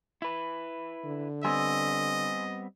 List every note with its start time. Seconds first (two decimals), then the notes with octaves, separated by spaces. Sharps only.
0.22 E4 B4
1.05 D3
1.44 G3 B3 C4 D#5 G#5 C6 E6